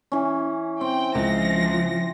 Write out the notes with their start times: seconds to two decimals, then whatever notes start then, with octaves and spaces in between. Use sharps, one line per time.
0.12 E3 C#4
0.81 C4 G5
1.15 C#2 F3 A#6